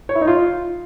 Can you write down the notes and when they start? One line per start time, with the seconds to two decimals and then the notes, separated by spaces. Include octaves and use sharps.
0.09 C#5
0.15 E4
0.21 D#4
0.27 F4